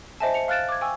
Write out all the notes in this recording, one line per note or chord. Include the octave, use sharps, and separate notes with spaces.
C5 D#5 E5 G#5 A5
C#7 F7
F5 F6 F#6 A6 D7 E7
D6 G#6
G5 G#5 C#6 E6